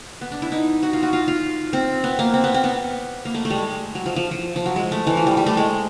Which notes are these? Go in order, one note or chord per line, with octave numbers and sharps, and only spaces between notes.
B3
D4
E4
D#4
F#4
F4
F#4
F4
F4
C4
B3
A#3
C4
B3
C4
B3
A#3
A3
A3
G3
G#3
F#3
F3
F3
F3
F3
F#3
G#3
A3
E3
F3
G3
G3
A3
G#3